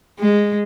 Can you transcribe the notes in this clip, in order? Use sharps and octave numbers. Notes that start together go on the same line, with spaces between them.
G#3